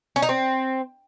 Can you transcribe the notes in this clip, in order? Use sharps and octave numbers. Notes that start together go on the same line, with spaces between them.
C#4
D#4
C4